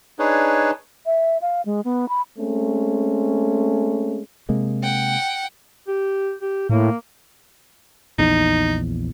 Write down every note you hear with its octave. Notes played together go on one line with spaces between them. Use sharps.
D4 D#4 G#4 B4 C#5
E5
F5
G#3
B3
B5
G#3 A3 C4 C#4
C3 G#3 A#3
F#5 G5
G4
G4
A2 A#3
A#1 E2 D#4